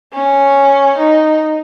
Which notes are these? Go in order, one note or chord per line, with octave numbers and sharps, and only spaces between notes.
C#4
D#4